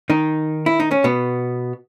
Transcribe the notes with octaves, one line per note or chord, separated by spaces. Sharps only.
D#3 D#4
E4
D#4
C#4
B2 B3